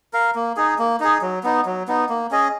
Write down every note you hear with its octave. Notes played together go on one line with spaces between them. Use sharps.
A#4 F5
A#3
D#4 G#4
A#3
D#4 G#4
F#3
B3 D#4
F#3
B3 D#4
A#3
C#4 G#4 D#5